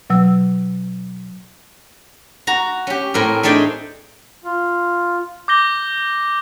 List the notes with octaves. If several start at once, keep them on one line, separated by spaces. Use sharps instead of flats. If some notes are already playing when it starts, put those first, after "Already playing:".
B2 F#3 E6
F#4 A#5
C#4 G4
A2 C4 A#4
A3 D4 D#4 G#4 D5 G5
F4
D6 G6 A#6 G7